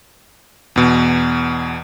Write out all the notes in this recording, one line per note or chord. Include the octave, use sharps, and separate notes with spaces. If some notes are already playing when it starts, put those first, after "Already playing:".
E2 B2